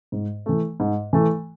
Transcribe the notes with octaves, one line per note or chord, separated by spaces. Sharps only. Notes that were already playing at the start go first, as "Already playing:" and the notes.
G#2
E3 A3
G#2
E3 A3